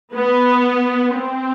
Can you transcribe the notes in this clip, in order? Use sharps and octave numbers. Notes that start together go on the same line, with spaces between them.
B3
C4